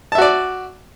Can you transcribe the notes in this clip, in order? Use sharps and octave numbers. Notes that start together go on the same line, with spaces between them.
F#4 D5 E5 A5